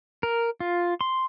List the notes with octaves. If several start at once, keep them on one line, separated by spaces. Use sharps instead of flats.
A#4
F4
C6